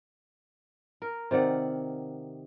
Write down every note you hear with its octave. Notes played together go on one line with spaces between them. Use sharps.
A#4
C3 D#3 D5 F#5